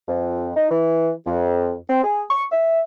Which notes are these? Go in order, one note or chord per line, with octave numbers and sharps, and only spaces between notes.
F2
D#4
E3
F2
C4
G#4
C#6
E5